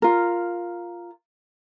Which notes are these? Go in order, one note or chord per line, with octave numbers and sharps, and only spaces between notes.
F4 A#4